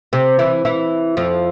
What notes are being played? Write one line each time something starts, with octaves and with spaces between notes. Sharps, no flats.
C3 C4
E3 E4
E3 E4
F2 F3